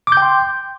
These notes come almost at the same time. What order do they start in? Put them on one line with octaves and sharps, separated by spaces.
D6 G6 G5 C6